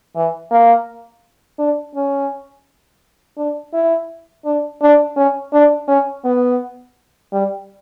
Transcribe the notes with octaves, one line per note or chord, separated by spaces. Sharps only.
E3
A#3
D4
C#4
D4
E4
D4
D4
C#4
D4
C#4
B3
G3